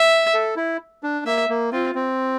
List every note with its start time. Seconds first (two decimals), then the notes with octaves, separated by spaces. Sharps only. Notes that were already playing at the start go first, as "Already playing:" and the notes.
Already playing: E5
0.34 A4
0.56 E4
1.03 D4
1.25 A#3 E5
1.49 A#3
1.72 C4 F4
1.95 C4